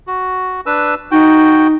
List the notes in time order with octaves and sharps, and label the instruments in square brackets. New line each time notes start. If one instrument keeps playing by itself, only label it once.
[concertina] F#4
D4 B4 E6
[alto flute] D#4 [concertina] F#4 G5